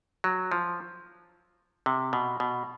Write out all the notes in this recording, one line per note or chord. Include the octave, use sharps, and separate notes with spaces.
F#3
F3
C3
B2
B2